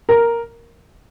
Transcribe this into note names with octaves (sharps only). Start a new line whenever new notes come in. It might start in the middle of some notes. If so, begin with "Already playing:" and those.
A#4